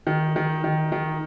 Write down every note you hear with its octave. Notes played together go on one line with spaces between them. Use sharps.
D#3
D#3
D#3
D#3